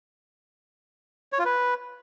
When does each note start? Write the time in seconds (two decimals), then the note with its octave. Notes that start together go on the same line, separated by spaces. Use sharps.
1.32 C#5
1.39 F4
1.45 B4